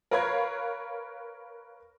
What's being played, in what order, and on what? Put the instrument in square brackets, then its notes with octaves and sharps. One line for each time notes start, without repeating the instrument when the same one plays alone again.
[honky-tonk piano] A#4 B4 C#5 F5 B5 G#6